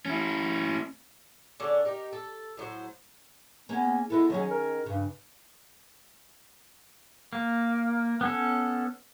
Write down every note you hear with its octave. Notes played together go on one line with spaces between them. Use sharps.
C#4 E4
D3 C#4 D4 G#4
D#4 G4 A#4
A4
A2 F#3 G4 C5
A#3 B3 C#4 G#4
G#3 B3 E4 A4
D#3 F#3 C#4 G#4
A#4
G2 C#3
A#3
B3 C#4 A4